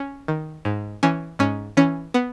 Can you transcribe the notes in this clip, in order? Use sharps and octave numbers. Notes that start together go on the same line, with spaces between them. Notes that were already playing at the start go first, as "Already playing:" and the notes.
Already playing: C#4
D#3
G#2
E3 C#4
G#2 C#4
E3 C#4
B3